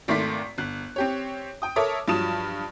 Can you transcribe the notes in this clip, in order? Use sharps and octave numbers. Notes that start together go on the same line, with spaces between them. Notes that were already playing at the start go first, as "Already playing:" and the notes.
G#1 D#3 A3 C6 D6 B6
G1 F#6
C4 G4 C#5
G5 D#6
A4 A#4 C#5 E5 D6 D#6
G2 F3 F#3 A5 D#6 E7